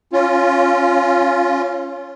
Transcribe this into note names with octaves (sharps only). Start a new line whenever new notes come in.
C#4 F4